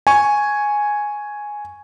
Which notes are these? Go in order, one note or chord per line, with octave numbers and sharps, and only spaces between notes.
G#5 C#6